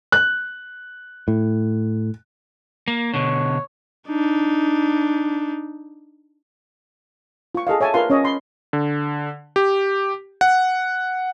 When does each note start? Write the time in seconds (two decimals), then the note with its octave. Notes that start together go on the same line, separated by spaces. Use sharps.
0.12 F#6
1.28 A2
2.88 A#3
3.14 B2 D3 C#5
4.08 D4 D#4
7.55 F4 C#6
7.67 G#4 A4 D#5 F5
7.81 C#5 E5 G#5 A5
7.94 F4 A#4 B4 F5 C6
8.10 C#4 C#5 D#5
8.24 B5 C6
8.73 D3
9.56 G4
10.41 F#5